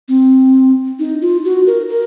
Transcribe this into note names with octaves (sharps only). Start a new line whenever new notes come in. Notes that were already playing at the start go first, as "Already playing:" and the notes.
C4
D#4
F4
F#4
A#4
A#4